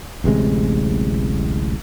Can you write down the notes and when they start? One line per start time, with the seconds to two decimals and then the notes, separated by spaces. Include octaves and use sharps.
0.24 D1 A1 C3 G#3